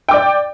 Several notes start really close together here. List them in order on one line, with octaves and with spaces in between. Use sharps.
G5 D6 D5